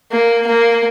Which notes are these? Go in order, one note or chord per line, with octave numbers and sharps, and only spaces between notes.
A#3
A#3